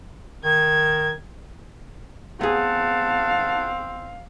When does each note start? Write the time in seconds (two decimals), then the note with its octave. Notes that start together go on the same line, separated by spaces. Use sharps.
0.44 D#3 G#6
2.41 B3 C4 G#4 F5 F#5 A5